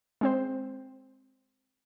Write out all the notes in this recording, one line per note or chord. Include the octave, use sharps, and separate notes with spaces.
G#3 C4 C5